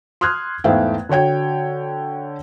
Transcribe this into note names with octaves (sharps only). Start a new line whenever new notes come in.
C6 D#6 F6 F#6 G#6
E2 G#2 A3 E5 F5 G5
D3 F#4 C#5 G5 G#6